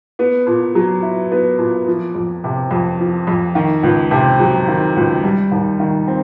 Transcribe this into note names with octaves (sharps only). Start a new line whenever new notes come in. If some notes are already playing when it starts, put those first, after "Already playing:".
B3
A#2
F#3
E4
B3
A#2
F3
F2
C3
F2
F3
F2
D#3
C#2
C3
F#3
D#3
C#2
G3
D#2
D#3
C4